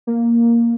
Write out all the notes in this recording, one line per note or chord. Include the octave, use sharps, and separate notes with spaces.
A#3